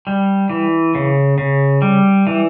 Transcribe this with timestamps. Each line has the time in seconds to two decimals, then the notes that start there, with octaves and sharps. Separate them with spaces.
0.07 G3
0.50 E3
0.95 C#3
1.38 C#3
1.82 G3
2.27 E3